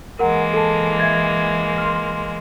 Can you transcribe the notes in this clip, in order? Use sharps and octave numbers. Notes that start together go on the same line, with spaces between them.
E3 G#3 A#3 A#4 F#5 A#5
A4 A5
E5 G#6 A6
C6 F6